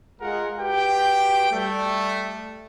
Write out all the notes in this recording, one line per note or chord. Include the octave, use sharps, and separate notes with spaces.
G#3 F4 G#4 A#4 F#5
F#4 G4 B4 G5
G3 A3